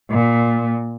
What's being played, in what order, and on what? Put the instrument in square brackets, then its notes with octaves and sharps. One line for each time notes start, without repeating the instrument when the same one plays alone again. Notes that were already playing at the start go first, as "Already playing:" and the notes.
[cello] A#2